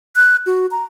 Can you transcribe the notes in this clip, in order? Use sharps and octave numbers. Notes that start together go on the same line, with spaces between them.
F#6
F#4
A#5